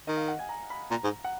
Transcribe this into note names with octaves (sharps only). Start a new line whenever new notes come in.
D#3 D#5
F5
F#5
G#5
A#5
B5
A#2 A#5
G#2
F#5